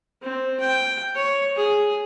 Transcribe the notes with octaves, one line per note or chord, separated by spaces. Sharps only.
C4
G5
C#5
G#4